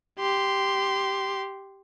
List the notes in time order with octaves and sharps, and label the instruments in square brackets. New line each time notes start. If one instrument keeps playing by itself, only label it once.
[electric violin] G4 C6